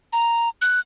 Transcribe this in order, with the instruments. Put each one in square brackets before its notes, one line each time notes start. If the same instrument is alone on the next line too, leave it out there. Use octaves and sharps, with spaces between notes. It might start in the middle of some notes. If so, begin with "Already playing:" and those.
[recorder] A#5
F#6